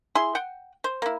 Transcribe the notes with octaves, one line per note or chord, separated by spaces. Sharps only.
E4 G#4 C6
F#5 G5
C5
A#3 E4